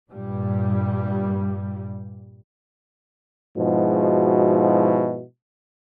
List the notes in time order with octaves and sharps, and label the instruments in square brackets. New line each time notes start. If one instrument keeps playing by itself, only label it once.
[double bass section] G2 A#2 G3
[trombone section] G#2 B2 F3 G#3 E4 F#4